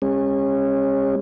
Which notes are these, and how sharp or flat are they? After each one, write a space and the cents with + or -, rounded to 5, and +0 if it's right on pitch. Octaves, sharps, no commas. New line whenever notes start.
G#3 -45 C#4 -25